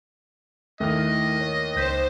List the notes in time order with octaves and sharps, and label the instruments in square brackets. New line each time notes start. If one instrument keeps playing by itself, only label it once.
[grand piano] D#2 F6 [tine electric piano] A3 E4 [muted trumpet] D#5
[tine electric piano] C#5
[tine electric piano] C#2 G6 B6 [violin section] C5